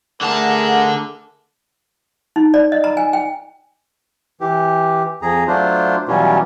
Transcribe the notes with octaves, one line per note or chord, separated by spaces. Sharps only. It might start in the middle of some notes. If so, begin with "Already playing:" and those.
D3 A3 G#4 A#4 A5
D#4
D5
D#5
A#5
G#5
G5
E3 G4
F2 G#4 A#5
F#3 A3 D4 F4 C5
B2 E3 F#3 G3 C#4 F4